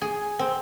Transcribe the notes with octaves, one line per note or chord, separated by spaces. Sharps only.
G#4
C4